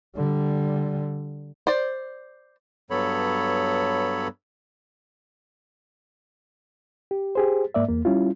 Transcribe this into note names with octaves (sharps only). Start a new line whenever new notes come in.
D3 G3
C5 D5
G2 F#3 B3 A4 C#5 B5
G4
G4 G#4 C5
G#2 A#3 D5 E5
E2 A#3
G3 C#4 E4 F4